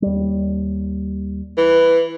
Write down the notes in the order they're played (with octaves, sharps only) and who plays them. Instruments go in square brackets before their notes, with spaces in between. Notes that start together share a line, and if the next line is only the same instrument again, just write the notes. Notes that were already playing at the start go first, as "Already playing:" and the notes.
[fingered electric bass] D#2 G3
[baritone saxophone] E3